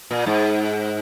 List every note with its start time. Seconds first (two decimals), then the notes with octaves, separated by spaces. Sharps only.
0.11 A#2
0.26 G#2